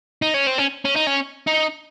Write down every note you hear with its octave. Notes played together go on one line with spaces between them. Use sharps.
D#4
C#4
C4
C#4
C#4
D#4
C#4
D#4